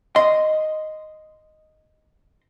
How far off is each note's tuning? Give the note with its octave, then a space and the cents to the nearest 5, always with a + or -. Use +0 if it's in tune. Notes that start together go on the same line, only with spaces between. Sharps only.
D#5 +0 C6 -15